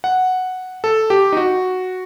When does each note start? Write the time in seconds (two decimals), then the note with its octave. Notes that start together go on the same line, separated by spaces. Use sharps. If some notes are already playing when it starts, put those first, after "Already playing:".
0.04 F#5
0.84 A4
1.10 G4
1.33 D#4
1.37 F#4